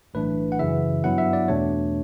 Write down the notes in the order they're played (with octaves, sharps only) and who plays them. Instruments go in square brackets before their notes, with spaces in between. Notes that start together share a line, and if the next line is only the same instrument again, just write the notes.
[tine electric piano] B1 A2 E3 A3 D4 B4
F#5
F#2 C#3 E3 E5
G2 F#3 B3 E4 F#5
E5
D5
E2 B2 A3 D4 C#5